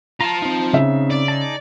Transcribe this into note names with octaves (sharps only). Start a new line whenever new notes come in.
F4 A5 A#5
C4 D#4
C#3 E5
D5
D#4 G#4 A5